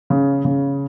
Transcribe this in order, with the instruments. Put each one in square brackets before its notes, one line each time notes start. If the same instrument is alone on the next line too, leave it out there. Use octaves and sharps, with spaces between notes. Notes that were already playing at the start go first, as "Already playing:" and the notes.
[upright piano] C#3
C#3